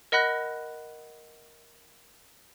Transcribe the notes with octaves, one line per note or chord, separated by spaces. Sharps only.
A#4 D#5 F#5 B5 F#6 A#6